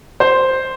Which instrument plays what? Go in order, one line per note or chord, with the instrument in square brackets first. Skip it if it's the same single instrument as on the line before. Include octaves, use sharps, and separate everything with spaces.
[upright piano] C5